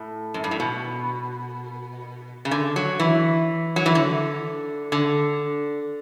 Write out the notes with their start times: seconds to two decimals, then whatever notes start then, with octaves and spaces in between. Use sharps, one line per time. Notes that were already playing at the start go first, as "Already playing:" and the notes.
Already playing: A2
0.34 F#2
0.44 G2
0.51 A2
0.60 B2
2.45 C#3
2.51 D3
2.76 F#3
2.99 E3
3.76 F#3
3.86 E3
3.95 D3
4.92 D3